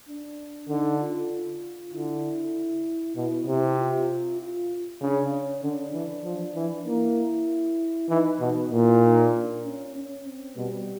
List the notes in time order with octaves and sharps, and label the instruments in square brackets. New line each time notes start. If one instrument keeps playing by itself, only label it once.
[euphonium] D4
[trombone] D3 [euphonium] D#4
[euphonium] F4
[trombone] D3 [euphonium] E4
[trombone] B2 [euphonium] E4
[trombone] C3 [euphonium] E4
[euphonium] F4
F4
[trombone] C#3 [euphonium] D4
[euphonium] C#4
[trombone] D3 [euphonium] D4
[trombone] E3
F3
E3
[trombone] A#3 [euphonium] E4
[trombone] E3 [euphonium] D#4
[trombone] B2 [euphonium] D#4
[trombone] A#2 [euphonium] E4
[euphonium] D#4
D4
C#4
C#4
C4
[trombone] B2 [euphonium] G3